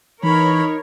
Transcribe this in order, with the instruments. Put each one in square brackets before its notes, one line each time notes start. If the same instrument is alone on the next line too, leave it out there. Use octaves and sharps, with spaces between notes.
[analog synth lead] E3 [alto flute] D#4 [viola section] A#4 C#5 [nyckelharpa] B5